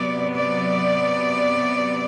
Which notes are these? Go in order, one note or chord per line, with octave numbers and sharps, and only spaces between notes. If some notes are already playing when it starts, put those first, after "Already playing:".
Already playing: C3 F#3 B3 D5
D5